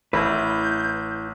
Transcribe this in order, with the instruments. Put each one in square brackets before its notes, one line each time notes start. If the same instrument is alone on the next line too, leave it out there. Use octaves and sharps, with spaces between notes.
[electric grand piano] A1 [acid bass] E4 [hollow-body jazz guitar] B4 [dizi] G6